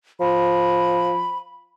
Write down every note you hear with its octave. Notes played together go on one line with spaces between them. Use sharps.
F3 B5